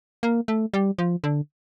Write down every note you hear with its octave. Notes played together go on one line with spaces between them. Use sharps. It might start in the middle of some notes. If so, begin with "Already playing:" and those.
A#3
A3
G3
F3
D3